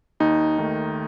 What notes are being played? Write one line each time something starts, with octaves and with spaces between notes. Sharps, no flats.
D#2 D#4
D#3 A3